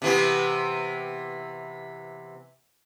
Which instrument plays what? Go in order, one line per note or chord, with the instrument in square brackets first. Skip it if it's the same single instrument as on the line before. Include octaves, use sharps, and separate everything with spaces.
[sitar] C3 E3 B3